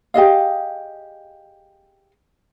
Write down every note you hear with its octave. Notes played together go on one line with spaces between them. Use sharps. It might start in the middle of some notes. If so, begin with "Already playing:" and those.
G4 G#4 D#5 F5